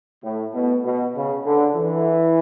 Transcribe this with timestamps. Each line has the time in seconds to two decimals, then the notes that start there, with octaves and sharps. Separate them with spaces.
0.23 A2
0.54 B2
0.84 B2
1.15 C#3
1.45 D3
1.76 E3